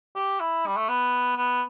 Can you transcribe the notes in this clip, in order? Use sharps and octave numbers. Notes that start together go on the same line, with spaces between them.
G4
E4
G3
A3
B3
B3